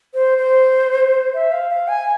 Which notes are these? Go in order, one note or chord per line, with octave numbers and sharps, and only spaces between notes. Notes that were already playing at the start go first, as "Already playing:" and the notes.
C5
C5
E5
F5
F5
G#5